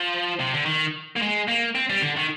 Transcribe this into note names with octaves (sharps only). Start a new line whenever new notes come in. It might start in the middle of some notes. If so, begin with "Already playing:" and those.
Already playing: F3
C3
D3
D#3
A#3
G#3
A#3
C4
G3
D3
D#3